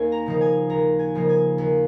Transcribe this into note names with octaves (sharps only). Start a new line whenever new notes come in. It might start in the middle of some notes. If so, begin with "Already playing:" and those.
Already playing: D#2 A#3 D#4 G#5
A#5
C#3 F3 A#3 D#4
G#5
D#2 A#5
G#5
C#3 F3 A#3 D#4
G#5
D#2